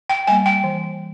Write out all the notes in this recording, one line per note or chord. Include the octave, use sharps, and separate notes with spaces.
G5
G3 A#3 G#5
G5
E3